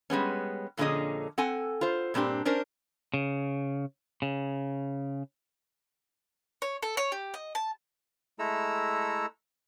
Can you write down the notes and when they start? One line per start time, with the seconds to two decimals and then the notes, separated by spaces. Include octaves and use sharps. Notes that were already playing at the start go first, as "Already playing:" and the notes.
0.10 G3 G#3 B3 C#4
0.77 F2 A#2 D3 C#4 G#4 D#5
1.38 C4 A4 F#5 G#5
1.81 F4 C5
2.14 G2 A#2 C4 D4 G4
2.45 C#4 D4 A#4 C5
3.14 C#3
4.22 C#3
6.62 C#5
6.82 A4
6.97 C#5
7.12 G4
7.34 D#5
7.55 A5
8.39 G#3 A3 E4 A4 A#5 E6